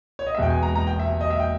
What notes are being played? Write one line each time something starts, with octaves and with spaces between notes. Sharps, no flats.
C#5
D#5
E5
E1 E2 B2 G#3 G5
G#5
A#5
A#5
G5
E5
D#5
E5
G5